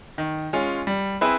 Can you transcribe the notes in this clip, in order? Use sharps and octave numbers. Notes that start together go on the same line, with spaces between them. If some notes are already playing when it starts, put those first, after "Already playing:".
D#3
G#3 C#4 F4
G3
C4 E4 G#4 B4